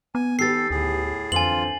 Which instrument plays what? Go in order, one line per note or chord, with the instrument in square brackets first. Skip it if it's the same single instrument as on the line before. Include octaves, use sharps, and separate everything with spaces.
[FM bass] B3 [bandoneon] G#5
[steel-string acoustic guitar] D#3 G4 B4 [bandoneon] A4 [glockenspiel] A6 C7
[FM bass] D2 [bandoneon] A2 G#4
[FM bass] F2 [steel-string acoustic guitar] D3 E3 C4 [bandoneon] F4 [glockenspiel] G#5 F#7